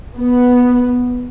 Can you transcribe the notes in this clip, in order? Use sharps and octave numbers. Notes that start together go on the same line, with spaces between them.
B3